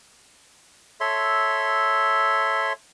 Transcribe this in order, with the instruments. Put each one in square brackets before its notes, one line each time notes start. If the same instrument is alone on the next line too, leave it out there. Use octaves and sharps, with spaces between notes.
[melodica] A4 C#5 E5 C6